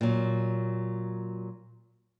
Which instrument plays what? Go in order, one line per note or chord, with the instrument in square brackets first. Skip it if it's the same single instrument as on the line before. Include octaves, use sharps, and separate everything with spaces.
[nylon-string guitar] A#2 F#3